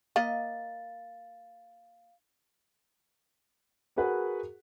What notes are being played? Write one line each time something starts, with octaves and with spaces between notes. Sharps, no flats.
A#3 D#5 F5 A6
F#4 G#4 A#4 B4 F#5